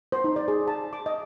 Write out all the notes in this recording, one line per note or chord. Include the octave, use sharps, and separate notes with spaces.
C5
D#4
D5
G#4
A5
D6
D#5